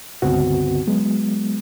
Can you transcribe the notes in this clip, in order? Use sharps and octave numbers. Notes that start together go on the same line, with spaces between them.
C#2 G2 D3 B3 C4 F#4
F#3 G#3 B3